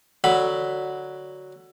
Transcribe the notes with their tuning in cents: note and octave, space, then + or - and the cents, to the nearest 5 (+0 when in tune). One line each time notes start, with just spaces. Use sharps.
D3 +10 F#3 +0 B5 +0